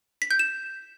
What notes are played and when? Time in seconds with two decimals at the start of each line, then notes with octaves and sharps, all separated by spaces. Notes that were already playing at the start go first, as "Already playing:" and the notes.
0.22 B6
0.31 G6
0.39 E7